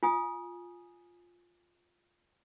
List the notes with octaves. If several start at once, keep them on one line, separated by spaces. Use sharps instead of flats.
F4 G#5 D#6